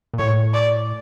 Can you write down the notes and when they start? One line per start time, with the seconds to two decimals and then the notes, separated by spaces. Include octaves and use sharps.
0.14 A#2
0.19 A2 C#5
0.54 D5